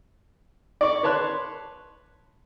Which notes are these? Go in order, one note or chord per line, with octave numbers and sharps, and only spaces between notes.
D5 C#6
B4 C#5 A5 C6 F#6